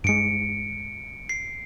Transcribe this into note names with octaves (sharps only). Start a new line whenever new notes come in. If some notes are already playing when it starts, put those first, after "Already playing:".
G2 G#3 C#7 D7
C7